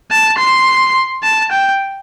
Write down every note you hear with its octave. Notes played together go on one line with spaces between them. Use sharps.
A5
C6
A5
G5